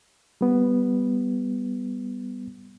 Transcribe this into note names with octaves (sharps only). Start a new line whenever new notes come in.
G3 B3